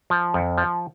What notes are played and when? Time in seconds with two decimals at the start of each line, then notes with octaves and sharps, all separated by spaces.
0.10 F3
0.34 F2
0.58 F3